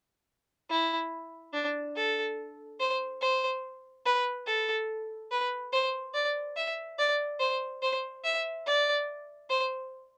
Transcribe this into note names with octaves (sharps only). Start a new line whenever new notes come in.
E4
D4
A4
C5
C5
B4
A4
B4
C5
D5
E5
D5
C5
C5
E5
D5
C5